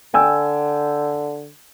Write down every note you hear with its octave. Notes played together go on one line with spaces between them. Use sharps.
D3 G5 G#5 E6